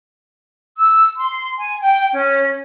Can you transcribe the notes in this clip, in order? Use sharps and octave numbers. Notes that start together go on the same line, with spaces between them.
E6
C6
G#5
G5
C#4